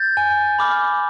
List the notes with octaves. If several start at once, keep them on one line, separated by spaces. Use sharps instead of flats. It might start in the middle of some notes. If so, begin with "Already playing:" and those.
Already playing: G6 A6
G#5
B5 D6 F6